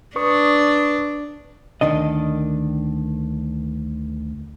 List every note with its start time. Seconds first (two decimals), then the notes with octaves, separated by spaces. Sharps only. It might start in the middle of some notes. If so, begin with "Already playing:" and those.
0.16 D4 B4 C#6 D#6
1.81 D2 D#3 D4 D#5